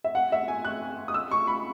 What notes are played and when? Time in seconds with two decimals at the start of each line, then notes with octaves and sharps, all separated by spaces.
0.04 E5
0.15 F#5
0.32 E5
0.48 G#5
0.65 F#6
1.08 D#6
1.14 E6
1.31 C#6
1.47 B5